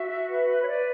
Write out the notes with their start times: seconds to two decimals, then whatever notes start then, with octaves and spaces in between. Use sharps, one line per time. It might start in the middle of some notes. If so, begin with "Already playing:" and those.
Already playing: F#4 E5
0.29 B4
0.62 C#5
0.66 B4 D5